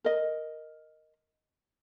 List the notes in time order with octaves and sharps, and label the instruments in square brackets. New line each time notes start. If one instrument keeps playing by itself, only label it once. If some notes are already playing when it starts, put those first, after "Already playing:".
[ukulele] A#4 D#5